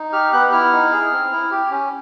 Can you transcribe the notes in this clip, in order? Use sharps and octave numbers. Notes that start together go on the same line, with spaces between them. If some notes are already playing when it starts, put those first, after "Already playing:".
Already playing: D#4
G4 F6
B3 F#6
F#6
E4 F6
D#4
G#4
C4
E4
G4
C#4